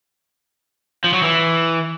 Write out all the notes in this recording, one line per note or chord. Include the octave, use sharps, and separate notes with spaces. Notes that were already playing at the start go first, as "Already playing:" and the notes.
F3
F#3
E3